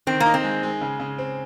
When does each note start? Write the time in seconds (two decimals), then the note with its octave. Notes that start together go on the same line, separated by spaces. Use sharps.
0.07 D#3 C4
0.20 A#3
0.26 D#4
0.34 C4
0.44 G#3
0.63 G#3
0.81 C#3
1.00 C#3
1.18 C4